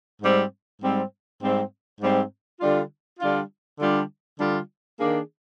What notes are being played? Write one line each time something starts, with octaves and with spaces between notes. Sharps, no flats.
G#2 G3 C4
G#2 G3 C4
G#2 G3 C4
G#2 G3 C4
D3 G3 D4 F4
D3 G3 D4 F4
D3 G3 D4 F4
D3 G3 D4 F4
D#3 A#3 D4 G#4